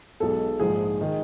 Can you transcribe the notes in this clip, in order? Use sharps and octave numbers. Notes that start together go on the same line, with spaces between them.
B1 B2 G#3 A4
A#1 G#2 F3 G#4
D#3 G#3